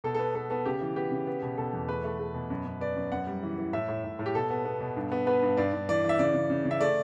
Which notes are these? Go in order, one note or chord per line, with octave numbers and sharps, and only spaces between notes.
B2 A4
A4
B3
B3 A4
B3 A4
C#3 G4
E3
B3 G4
C#3
B3
B2
B2 A4
E2
A3 B4
A3
A3
B2
F#2
F#2
B3 D5
F#2
F#2 F#5
G3
E3
E3
A2 E5
A2
A2
A2
G4
B2 A4
B3
B3
B2
G2
B3
B3 B4
G2
G2 D5
G2
E3 D5
E3
E5
C#3 D5
C#3
C#3
C#3
E5
A3 D5